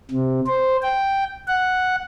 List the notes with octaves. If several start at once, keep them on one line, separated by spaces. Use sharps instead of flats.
C3
C5
G5
F#5